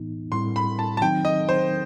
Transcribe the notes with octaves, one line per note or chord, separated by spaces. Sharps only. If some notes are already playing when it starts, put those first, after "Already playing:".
Already playing: A2 E3 B3 D#4
A2 G3 C4 E4 C6
B5
A5
A5
D#3 F#3 C4 D#4 G5
D#5
C5